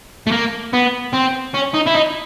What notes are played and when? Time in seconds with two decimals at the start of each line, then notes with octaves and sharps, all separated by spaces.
0.27 A3
0.32 A#3
0.73 B3
1.14 C4
1.55 C#4
1.74 D#4
1.87 E4
1.95 D#4